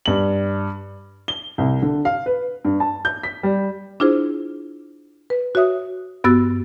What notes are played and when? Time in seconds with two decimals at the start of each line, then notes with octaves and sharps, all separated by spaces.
0.06 G2 F#7
1.28 G7
1.58 C2
1.82 D3
2.05 F5
2.26 B4
2.65 G2
2.80 A5
3.05 G6
3.23 B6
3.43 G3
4.00 D4 E4 F4 G#4 C5
5.30 B4
5.55 F#4 C#5 E5 D#6
6.24 G2 B3 F#4 E6 A6